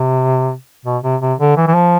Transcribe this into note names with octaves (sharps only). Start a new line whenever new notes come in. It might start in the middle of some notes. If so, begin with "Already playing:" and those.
Already playing: C3
B2
C3
C3
D3
E3
E3
F3